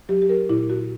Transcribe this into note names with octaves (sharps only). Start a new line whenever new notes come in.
F#3 G4
G4
A#4
A#2 E4
F#4